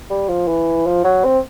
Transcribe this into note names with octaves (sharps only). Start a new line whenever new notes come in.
G3
F3
E3
F3
F#3
C4